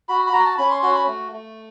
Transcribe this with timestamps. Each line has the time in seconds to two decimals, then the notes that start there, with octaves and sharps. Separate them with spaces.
0.09 F#4 B5
0.27 B5
0.33 F#4 A#5
0.46 A5
0.58 C#4 B5
0.71 C6
0.82 F#4 C6
0.94 B5
1.07 A3
1.32 A3